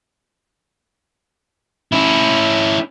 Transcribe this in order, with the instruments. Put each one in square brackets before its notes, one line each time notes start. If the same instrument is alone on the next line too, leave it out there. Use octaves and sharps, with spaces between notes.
[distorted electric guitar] C#4 E4